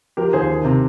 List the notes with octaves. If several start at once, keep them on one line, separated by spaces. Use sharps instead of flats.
F3 G4 A#4
D#2 G#4 C5
D#3
C3